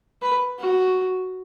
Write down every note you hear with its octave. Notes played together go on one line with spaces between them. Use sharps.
B4
F#4